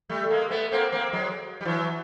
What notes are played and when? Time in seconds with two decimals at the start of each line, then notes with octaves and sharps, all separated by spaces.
0.09 G3 A3
0.30 G#3 A#3
0.51 A3 B3
0.72 A#3 C4
0.92 A#3 C4
1.13 F#3 G#3
1.61 G3
1.65 E3 F#3